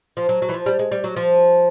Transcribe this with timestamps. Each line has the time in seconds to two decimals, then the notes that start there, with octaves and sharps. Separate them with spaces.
0.17 F3
0.29 F#3
0.42 F#3
0.49 E3
0.54 F3
0.66 G3
0.79 G#3
0.92 G3
1.04 F#3
1.16 F3